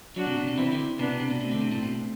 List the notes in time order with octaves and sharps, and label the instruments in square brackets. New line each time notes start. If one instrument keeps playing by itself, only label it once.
[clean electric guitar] F#3 [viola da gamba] D4 F#4
[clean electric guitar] C3
B2
C3
[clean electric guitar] E3 [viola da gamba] C4 E4
[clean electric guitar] D3
[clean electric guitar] C3 [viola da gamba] B3 D4
[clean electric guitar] B2
C3
B2
[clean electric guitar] B2 [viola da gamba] A3 C4
[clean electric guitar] D3
C3
A2
B2